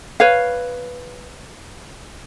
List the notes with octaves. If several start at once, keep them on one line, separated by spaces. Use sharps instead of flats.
B4 C#5 F5